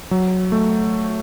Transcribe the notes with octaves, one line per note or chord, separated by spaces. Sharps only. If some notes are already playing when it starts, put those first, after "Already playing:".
F#3
A3